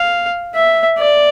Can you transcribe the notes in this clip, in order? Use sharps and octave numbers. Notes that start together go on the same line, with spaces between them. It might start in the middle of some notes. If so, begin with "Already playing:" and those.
Already playing: F5
E5
D5